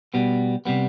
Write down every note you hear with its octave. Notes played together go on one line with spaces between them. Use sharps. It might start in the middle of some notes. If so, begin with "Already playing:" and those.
B2 G3 B3
C3 G3 B3